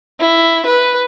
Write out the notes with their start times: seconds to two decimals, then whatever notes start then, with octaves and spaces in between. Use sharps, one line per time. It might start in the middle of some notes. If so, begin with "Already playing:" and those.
0.20 E4
0.66 B4